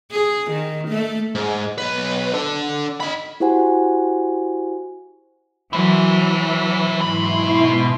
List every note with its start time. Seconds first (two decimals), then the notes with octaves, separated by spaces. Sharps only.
0.12 G#4
0.51 D#3
0.89 A3
1.35 G#2
1.78 B1 B4
2.34 D4 A4
3.00 D#4 B5
3.40 E4 F#4 G4 C5 F#5 G#5
5.73 E3 F#3 E4 C5
7.01 G#2 B2 E4 B5 C6